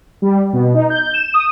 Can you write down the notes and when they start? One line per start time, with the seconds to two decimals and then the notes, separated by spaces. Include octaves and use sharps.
0.22 G3
0.53 B2
0.74 D#4
0.90 G6
1.14 E7
1.34 D#6